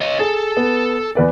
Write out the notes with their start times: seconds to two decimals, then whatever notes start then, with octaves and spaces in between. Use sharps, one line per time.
0.01 C#5 D#5
0.19 G#4 A4
0.57 B3
1.15 E2 B4 D5